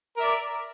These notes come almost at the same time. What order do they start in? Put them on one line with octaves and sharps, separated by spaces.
A#4 E5 D5